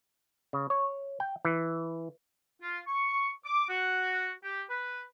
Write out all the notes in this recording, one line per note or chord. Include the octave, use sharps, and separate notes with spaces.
C#3
C#5
G5
E3
F4
C#6
D6
F#4
G4
B4